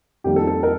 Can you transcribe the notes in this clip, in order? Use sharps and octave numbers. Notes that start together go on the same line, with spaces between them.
F2 D#3 G3 A#3 G4
A4
A4
A#4